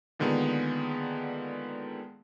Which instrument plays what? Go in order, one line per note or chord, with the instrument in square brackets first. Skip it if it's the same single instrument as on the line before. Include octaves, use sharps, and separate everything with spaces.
[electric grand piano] A#2 D3 D#3 G#3 B3